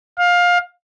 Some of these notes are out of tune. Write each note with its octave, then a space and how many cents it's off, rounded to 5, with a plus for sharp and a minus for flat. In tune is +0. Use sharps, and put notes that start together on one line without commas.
F5 +20